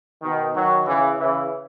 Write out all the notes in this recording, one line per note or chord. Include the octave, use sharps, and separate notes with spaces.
B2 D#3
D#3 F#3
C#3 E3
C#3 E3